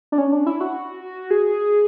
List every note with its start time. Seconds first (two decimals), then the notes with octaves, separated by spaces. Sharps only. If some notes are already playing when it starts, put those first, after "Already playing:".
0.12 D4
0.18 C#4
0.33 D4
0.46 E4
0.61 F#4
1.31 G#4